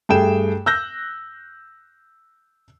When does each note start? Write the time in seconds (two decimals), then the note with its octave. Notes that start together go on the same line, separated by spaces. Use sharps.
0.09 G2 A3 G#4 G5 E7
0.66 E6 F#6 G6 A#6